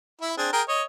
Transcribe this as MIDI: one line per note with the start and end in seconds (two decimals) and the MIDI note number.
0.21 0.37 64
0.21 0.37 76
0.38 0.49 60
0.38 0.49 62
0.38 0.49 68
0.53 0.62 68
0.53 0.62 70
0.53 0.62 79
0.68 0.83 73
0.68 0.83 75